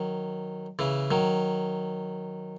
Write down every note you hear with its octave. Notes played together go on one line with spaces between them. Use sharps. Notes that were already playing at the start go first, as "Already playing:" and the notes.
Already playing: D#3 F#3
C#3 E3
D#3 F#3